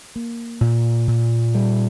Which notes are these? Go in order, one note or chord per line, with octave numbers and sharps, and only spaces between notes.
A#3
A#2
A#2
G3